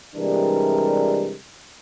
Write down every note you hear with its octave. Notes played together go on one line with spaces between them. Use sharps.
C3 E3 G3 G#3 D4 A#4